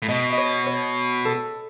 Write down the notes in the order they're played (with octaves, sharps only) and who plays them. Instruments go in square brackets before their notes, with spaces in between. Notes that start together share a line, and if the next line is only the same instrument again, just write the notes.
[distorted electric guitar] A2
[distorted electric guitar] B2 [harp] D#5
[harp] D#5
C#5
C#5
A4